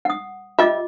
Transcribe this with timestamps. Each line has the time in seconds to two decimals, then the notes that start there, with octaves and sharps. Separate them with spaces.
0.05 F#5 D#6
0.59 G3 F4 D#5 E5 D6